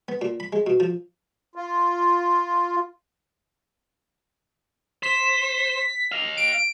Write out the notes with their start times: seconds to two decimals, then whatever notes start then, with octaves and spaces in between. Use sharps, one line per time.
0.08 B3
0.22 A#2
0.40 B5
0.53 G#3
0.67 B2
0.80 F3
1.56 F4
5.03 C5 B6
6.12 D#5 F5
6.37 D7